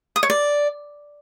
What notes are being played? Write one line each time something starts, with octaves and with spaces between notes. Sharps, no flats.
D#6
C#5
D5